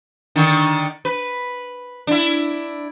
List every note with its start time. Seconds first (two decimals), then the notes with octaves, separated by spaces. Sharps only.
0.36 D3 D#3
1.05 B4
2.07 D4 E4